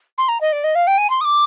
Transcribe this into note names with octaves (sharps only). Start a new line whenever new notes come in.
C6
A#5
D#5
D5
D#5
F5
G5
G#5
C6
D#6
D6